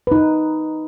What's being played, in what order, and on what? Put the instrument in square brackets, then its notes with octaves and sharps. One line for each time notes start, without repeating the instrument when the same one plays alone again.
[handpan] D#4 B4